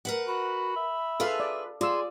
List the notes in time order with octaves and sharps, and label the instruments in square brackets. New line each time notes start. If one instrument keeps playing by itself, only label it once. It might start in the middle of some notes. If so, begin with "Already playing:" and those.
[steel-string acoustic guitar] A#4 B4 F#5
[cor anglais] F#4 [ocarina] B5
[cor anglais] E5
[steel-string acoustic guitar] F4 G#4 B4 [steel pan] A4 F5 A5
[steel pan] D5
[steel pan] F4 E6 [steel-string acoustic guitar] G#4 [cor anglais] D5 [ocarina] C6